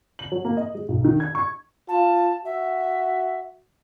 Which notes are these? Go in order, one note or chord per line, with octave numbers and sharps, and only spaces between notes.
F#7
F#3
A#3
D#5
G#3
B1
D#3
G#6
C#6
F4 A5
F#4 E5